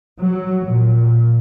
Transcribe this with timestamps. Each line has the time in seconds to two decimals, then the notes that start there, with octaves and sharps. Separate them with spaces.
0.20 F#3
0.67 A#2